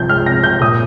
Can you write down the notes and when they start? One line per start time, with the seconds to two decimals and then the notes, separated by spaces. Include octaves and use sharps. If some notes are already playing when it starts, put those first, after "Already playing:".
Already playing: C2 C3 F3 G6
0.09 G#3 F6
0.26 C3 A#6
0.43 C3 G6
0.61 A#2 D#6